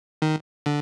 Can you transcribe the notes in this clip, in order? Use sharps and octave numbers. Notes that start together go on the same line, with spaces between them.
D#3
D3